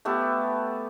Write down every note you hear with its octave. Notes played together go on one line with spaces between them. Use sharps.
A3 B3 G4 A4